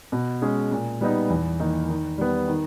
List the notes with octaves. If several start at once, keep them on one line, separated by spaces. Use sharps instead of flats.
B2
G#3 C#4 G#4
A#2
G3 B3 D#4
E2
D#3 A#3 D#4
D#3
G3 B3
D#3